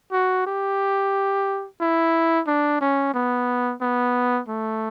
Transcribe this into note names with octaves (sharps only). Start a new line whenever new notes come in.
F#4
G4
E4
D4
C#4
B3
B3
A3